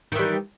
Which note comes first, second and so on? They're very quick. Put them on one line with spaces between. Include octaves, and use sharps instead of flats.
D#3 E3 G3